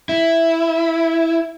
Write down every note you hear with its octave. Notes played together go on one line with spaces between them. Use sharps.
E4